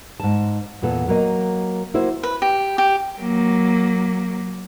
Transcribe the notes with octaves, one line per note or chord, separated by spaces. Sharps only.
G#2 A5
E2 A#2 B3 A4
F#3 A#3 A#4 D#5
A#3 E4 F#4 C5
B4
G4
G4
F#3 A#3